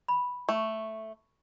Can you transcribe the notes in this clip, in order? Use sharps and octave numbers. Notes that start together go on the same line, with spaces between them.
B5
A3 C#6